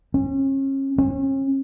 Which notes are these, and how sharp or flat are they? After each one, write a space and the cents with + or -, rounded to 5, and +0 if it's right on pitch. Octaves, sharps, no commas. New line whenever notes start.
C#4 -35
C#4 -40